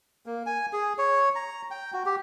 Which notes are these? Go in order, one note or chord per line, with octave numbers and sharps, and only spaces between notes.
A#3
G#5
G#4
C#5
A#5
G5
F#4
G4